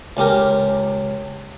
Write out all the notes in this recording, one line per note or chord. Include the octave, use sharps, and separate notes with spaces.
C#2 C#4 G4 A#4